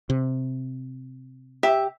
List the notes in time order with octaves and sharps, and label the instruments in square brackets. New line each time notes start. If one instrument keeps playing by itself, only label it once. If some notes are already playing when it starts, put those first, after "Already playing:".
[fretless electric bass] C3
[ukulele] G4 [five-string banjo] E5